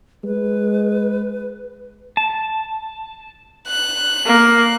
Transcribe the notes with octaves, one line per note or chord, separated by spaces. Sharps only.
G#3 B4
A5
F#6
A#3